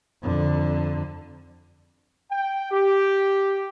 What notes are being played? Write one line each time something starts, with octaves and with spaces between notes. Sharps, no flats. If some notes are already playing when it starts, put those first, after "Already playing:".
F2 D3
G5
G4